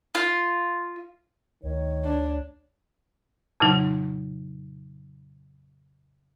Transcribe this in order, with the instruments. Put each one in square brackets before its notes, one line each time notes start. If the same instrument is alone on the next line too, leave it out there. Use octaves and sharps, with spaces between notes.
[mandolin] F4
[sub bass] D2 [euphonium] D#3 [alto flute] C#5
[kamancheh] D4
[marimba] F2 A#2 C#3 F#3 D#4